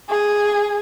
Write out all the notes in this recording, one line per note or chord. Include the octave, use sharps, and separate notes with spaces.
G#4